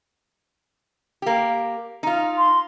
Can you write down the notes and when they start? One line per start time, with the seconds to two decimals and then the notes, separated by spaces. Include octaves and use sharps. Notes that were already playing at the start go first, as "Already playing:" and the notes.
1.22 A#3 G4
2.03 D#4 F4
2.38 C6